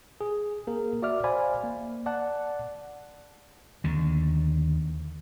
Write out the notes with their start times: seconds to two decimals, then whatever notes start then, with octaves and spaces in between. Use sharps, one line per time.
0.21 G#4
0.67 A#3 G#4 A#4
1.02 F#4 D5 E5 D6 F6
1.24 C5 D5 F5 G#5 B5
1.64 A#3
2.06 D5 F#5 A5 F#6
3.84 D#2 D3